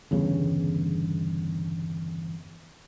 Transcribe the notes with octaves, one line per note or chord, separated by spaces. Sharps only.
G1 E2 G2 C#3